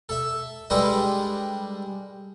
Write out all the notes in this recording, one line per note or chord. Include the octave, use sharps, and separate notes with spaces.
A4 E5
G3 G#3 D4 A4 B4 D#5